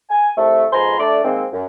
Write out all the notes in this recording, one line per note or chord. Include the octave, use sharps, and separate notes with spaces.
G#5
C2 A3
F2 G#2 B4 G#5 A#5 C6
A3 D4 D5
D#3 G#3 A#3 C4
F#2